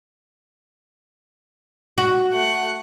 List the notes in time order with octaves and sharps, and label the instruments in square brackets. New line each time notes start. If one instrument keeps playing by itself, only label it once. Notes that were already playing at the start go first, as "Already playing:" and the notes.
[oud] F#4
[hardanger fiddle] A3 F#5